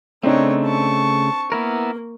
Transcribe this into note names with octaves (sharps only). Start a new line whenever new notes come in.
C#3 A3 C4 D4 D#4 C#5
A5 C#6
A#3 B3 E4 A#4